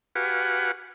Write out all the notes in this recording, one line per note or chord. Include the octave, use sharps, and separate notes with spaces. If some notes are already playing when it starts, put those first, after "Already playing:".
F#4 G4 B4 F5 F#5 G#5